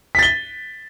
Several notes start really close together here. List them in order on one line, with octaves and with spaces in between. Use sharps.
B6 A6 G7